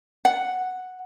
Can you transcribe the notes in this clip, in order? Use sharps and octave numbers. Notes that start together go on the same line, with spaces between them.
F#5